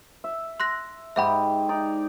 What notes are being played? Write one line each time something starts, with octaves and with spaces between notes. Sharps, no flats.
E5
C6 F#6 A#6
G#2 G4 D#5 E5 F#5 B5
D#4 D5